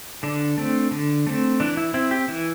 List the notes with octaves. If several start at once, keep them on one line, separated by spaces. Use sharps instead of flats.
D3 D4
A3 C4
D3
A3 C4
E3 D4
E4
C4 E4
G4
E3 E4